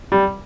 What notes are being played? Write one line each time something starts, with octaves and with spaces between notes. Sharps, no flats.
G3